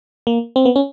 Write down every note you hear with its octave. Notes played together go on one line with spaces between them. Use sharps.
A#3
C4
B3
C#4